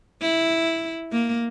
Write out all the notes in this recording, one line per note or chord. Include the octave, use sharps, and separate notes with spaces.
E4
A#3